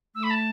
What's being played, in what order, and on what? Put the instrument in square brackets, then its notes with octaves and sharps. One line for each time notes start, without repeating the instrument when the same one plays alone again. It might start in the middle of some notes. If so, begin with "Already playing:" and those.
[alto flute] A3 [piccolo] E6
[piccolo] B5
A5